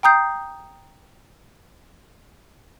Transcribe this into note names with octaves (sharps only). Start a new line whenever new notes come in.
G5 A#5 D#6 G6 C7